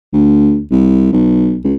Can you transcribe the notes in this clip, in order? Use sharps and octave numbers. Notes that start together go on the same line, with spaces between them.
D2
C2
B1
C#2